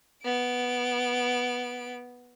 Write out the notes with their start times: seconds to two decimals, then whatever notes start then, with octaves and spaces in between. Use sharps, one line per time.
0.24 B3 D7